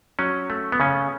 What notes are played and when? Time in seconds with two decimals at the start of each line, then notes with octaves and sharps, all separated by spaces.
0.19 F#3 C#4
0.50 A3
0.72 B3
0.80 C#3 C#4